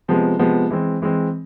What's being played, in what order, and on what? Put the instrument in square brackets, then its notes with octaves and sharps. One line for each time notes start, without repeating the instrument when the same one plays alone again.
[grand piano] C3 F3 G#3 B3
C3 F3 G#3 B3
E3 G#3 C4
E3 G#3 C4